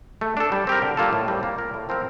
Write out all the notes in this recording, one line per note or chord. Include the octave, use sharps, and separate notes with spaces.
A3
D4 A4
G3
C4 G4 A#4
D3
G3 A#3 F4 A4
A2
G3 C4
A#3
F4 A#4 D5
A2
F3 C4 E4 A#4